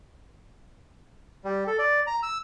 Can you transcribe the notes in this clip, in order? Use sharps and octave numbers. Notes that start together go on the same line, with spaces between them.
G3
A4
D5
A#5
E6